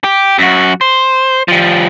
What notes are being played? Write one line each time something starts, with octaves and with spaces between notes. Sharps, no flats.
G4
F#2 F#4
C5
F3 G3